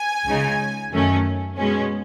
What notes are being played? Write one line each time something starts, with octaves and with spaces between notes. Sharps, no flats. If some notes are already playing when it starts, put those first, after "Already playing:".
Already playing: G#5
C#2 C#3 G#3 D#4
F#2 D#3 A3 C#4
B2 G#3 C#4